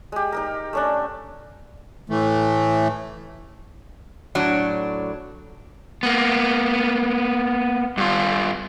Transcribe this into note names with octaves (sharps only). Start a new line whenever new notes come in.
G#3 G4
D#4 G4 A#4
A3 C#4 D4
A2 E3 A3
A2 F#3 D4
A#3 B3
G2 F4